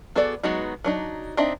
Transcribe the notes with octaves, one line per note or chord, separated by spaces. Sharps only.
B3 F#4 G#4 A4 D5
F#3 G#3 B3 D#4 F#4
F#3 D4 D#4
C4 D4 D#4 D#5 E5